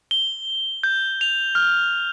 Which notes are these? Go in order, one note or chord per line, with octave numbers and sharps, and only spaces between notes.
G7
G6
F7
F6